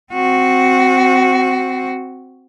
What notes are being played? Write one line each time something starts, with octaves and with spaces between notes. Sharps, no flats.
C4 F#4